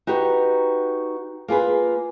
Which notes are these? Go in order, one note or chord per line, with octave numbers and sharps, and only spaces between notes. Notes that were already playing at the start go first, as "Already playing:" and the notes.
D#4 F#4 G4 B4
A#3 F4 G#4 B4